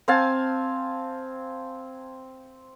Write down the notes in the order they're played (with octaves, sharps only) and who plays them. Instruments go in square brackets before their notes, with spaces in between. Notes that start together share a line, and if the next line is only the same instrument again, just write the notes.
[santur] C4 F5 G#5 A5